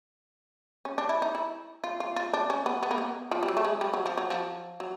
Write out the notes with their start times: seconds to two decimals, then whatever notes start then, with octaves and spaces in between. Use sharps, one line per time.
0.85 C#4
0.98 D4
1.09 E4
1.22 D#4
1.35 E4
1.84 F4
2.00 F4
2.16 F4
2.33 D4
2.50 C#4
2.66 B3
2.83 B3
2.91 A#3
2.98 B3
3.31 F3
3.43 G3
3.48 F#3
3.57 A3
3.65 G#3
3.81 G3
3.93 F#3
4.06 F3
4.17 F#3
4.30 F3
4.80 F#3